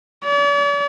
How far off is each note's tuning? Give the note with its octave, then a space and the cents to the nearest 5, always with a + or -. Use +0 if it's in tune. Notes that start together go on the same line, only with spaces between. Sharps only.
D5 -45